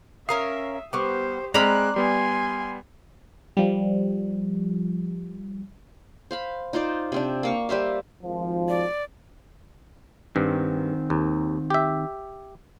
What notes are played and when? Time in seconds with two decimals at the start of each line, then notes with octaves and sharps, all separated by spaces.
0.29 C#4 A#4 E5 F5 D#6 C7
0.93 G3 B3 G4 C5 C#6 D6
1.54 G#3 C4 D5 A#5 B5 F6 F#6
1.96 G3 B3 G#5 C6
3.57 F3 G3
6.31 C5 F5 B5
6.73 D#4 F4 C5 D5
7.12 C3 C4 D4
7.43 A#3 F5 C#6
7.69 G3 C5 E5 F5
8.22 G#1 F3
8.69 D5
10.36 G2 D#3 C4
11.10 D#2
11.70 G4 E5